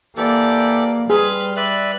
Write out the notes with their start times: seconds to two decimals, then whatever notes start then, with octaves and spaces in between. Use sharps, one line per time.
0.17 E3 A#3 G4 A4 D5
1.10 G3 G#4 B4 C6 F6
1.57 B4 D5 E5 F#6